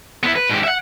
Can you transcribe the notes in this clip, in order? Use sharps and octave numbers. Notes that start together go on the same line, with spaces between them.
B3 E4
B4
G#2 G4
E5 F#5